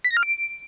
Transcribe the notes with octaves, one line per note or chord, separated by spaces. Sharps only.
B6
A#6
F6
D7